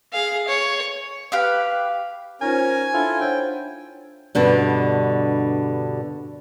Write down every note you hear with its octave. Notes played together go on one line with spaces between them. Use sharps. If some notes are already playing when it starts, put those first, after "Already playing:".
G#4 F5
C#5
G4 B4 F5
C#4 D#4 F4 A#4 C5 G#5
D4 E4 F4 A4 F#5
C5 C#5 F#5 G5
G2 B2 D3 G3